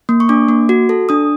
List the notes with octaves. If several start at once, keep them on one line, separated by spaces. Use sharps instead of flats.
A#3
C#6
D4 D6
A#3
F#4
A4
D4 D#6